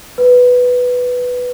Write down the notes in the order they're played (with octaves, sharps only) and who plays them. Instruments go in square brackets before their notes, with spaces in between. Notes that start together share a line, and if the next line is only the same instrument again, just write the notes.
[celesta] B4